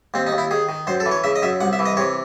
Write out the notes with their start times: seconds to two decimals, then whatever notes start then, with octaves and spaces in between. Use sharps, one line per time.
0.14 D#2 C4
0.27 D#4
0.32 D#2
0.38 E4
0.51 D#3 G#4
0.69 D#3
0.87 F#2 C5
1.00 A4
1.06 E3
1.11 C#5
1.24 C#3 E5
1.36 D#5
1.42 F#2 E5
1.61 C2 F#5
1.73 E5
1.79 E3
1.86 D#5
1.97 C3 C#5